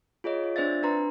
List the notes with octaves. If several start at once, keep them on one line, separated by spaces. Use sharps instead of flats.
F4 G#4 C#5 D#5
F4
C4 D4 C5 D5 E5 A6
D4 B4 A#5 C6